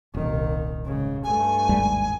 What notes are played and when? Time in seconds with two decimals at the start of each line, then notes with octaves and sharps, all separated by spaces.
0.14 D#1 C2 D#3
0.85 G#2 C#3
1.24 G2 A3 G#5
1.69 G#1 D#2 G3